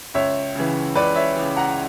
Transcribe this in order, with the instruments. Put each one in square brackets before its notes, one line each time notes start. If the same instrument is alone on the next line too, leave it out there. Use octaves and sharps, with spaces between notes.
[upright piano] C#2 C#5 E5
C#3 E3
C#2 B4 D5
C#5 E5
C#3 E3
F#5 A#5